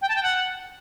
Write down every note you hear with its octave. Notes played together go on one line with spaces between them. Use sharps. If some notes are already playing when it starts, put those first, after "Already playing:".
G5
A5
G5
F#5